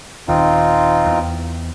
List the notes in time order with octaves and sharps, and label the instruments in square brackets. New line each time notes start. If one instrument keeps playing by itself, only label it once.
[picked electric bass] D#1 D#2 [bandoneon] C4 D#4 F4
[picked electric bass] E2